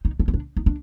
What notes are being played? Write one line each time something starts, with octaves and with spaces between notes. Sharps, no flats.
D#4
D4
C#4
D4
D#4
D4